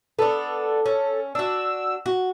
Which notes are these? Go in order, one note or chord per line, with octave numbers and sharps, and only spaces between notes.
B3 D4 A4
C#4
D4 F#4 E6
F#4